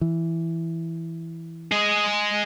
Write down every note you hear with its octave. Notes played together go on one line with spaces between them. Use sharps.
E3
G#4 D#5